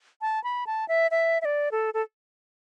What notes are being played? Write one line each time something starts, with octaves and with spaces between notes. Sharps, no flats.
A5
B5
A5
E5
E5
E5
D5
A4
A4